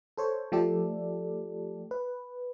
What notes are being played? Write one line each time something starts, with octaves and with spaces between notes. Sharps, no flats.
A4 C5 C#5
F3 A3 G4 A4 D5
B4